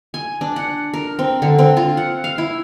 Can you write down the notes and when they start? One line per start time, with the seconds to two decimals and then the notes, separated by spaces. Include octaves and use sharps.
0.14 G#5
0.41 D4
0.56 F#5
0.94 A#4
1.19 C4
1.42 D3
1.59 C4
1.77 F4
1.97 F#5
2.24 F5
2.38 E4